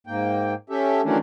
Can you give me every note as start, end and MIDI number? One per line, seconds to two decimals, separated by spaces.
0.07 0.54 44
0.07 0.54 58
0.07 0.54 79
0.70 1.01 61
0.70 1.01 67
0.70 1.01 69
0.70 1.01 76
1.04 1.18 51
1.04 1.18 52
1.04 1.18 54
1.04 1.18 57
1.04 1.18 61
1.04 1.18 62